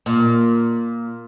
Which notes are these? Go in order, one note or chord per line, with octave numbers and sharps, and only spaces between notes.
A#2